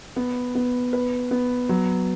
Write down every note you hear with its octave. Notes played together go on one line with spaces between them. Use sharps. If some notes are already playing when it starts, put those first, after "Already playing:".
B3
B3
B4
B3
F#3